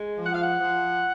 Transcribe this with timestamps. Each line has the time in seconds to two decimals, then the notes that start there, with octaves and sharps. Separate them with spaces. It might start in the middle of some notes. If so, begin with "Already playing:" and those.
Already playing: G#3
0.18 F3
0.26 F#5
0.34 F5
0.42 F#5
0.59 F3